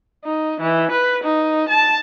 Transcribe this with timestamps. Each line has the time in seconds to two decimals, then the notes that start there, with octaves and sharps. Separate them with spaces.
0.25 D#4
0.60 E3
0.91 B4
1.24 D#4
1.68 A5